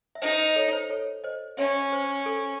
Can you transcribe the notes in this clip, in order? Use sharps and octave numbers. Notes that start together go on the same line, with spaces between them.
E5
D#4 C5 D#5
C5 D#5
A4 C#5
C5
A4 C#5
C5 D#5
C#4 C#5 E5
C5
A4